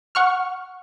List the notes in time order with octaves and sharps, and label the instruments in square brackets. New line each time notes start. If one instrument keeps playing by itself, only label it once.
[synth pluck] F#5 C#6 F6